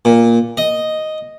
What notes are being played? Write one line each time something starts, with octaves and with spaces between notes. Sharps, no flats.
A#2
D#5